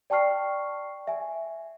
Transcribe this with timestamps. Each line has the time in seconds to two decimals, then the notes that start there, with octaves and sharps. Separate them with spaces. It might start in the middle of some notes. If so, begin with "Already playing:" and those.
0.10 D5 G5 A5 C#6 F6 C7
1.07 E5 G#5